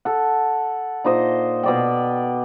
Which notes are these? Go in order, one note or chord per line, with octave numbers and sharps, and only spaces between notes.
A4 F#5
A#2 D#4 C5 D#5
B2 D5 G5